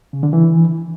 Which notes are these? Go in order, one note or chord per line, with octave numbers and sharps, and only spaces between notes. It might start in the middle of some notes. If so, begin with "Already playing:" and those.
C#3
D3
E3